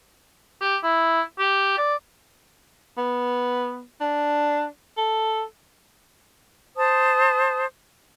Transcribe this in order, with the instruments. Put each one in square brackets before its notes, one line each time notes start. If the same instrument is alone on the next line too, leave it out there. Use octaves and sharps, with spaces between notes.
[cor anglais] G4
E4
G4
D5
[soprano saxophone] B3
D4
A4
[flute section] C5 A5 D#6